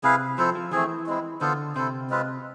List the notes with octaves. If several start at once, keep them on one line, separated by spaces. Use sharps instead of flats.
C3 E4 G#4 B4 F5
F3 C4 E4 A4 C5
F3
E3 A3 C4 G#4
G#3 C4 E4
D3 B3 F4 A4 C5
C3 E4 A4 C5
G#3 C4 F4 B4